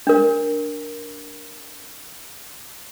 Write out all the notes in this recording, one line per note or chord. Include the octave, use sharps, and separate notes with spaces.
D4 A#4